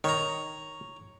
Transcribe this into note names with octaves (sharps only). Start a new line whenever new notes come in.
D#3 C#5 A#5